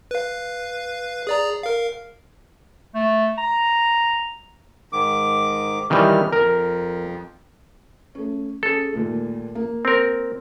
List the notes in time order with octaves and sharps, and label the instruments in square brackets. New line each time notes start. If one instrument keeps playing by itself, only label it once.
[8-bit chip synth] B4 F5
G#4 D5 A#5
A#4 F5
[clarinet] A3
A#5
[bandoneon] G#2 D#3 D6
[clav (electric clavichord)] D#3 E3 G3 [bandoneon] F6
[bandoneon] F2 [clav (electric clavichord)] A#4
[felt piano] A3 C#4
[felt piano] C#4 G#4 [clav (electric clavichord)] A4
[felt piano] D#2 A#2 A3
A#3
[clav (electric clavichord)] C4 A#4